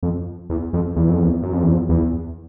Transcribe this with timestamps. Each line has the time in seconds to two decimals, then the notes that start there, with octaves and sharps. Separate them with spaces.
0.03 F2
0.50 E2
0.73 F2
0.96 E2
1.09 F2
1.22 E2
1.42 F#2
1.53 F2
1.63 E2
1.73 F2
1.89 E2